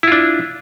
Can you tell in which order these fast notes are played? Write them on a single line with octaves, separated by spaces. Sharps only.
E4 F4 D4